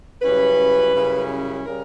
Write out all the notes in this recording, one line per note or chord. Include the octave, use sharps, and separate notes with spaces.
F#2 C#3 G3 C#4 E4 B4
F#2 C#3 G3 C#4 E4
C#3 G3 C#4 A#4